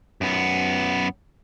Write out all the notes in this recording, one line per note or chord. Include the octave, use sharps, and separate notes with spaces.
F#2 B3